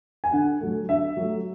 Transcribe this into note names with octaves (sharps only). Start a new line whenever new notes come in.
G#5
D3 F#5
F#3 A3
D3 E5
F#3 A3